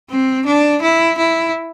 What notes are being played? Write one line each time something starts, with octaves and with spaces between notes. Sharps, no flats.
C4
D4
E4
E4